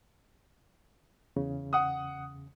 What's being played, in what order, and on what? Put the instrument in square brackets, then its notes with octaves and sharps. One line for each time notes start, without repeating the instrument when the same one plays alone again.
[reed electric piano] E2 C#3
[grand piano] F#5 D#6